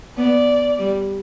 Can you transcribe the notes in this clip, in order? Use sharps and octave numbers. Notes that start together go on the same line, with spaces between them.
B3 D5
G3